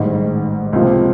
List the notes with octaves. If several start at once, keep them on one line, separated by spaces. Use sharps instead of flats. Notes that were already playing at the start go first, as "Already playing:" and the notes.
Already playing: A1 G#2 D#3 G3
C#2 C3 F3 A#3